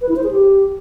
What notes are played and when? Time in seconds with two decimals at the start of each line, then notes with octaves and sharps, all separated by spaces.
0.01 B4
0.09 E4
0.16 C5
0.24 G#4
0.31 G4